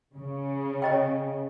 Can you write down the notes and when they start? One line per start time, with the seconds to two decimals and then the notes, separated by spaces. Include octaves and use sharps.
0.15 C#3
0.82 C#5 D#5 G5